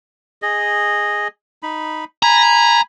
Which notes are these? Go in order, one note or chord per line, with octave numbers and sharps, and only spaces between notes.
G#4 D#5
D#4 B5
G#5 A#5 B5